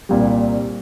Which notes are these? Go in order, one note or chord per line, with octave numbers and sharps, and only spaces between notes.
C2 A#2 G3